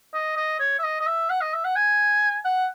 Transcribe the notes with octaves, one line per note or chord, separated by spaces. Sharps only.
D#5
D#5
C#5
E5
D#5
D#5
E5
F#5
D#5
E5
F#5
G#5
F#5